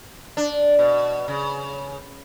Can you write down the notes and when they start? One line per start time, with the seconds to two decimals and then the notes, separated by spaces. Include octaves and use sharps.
0.37 D4
0.79 B2
1.28 C#3